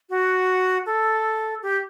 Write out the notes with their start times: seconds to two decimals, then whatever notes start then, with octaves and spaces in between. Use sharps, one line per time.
0.10 F#4
0.86 A4
1.62 G4